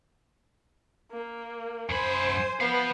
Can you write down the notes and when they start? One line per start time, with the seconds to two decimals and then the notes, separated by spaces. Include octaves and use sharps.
1.11 A#3
1.90 F#2 C5 G#5 B5
2.61 B3 C5 F5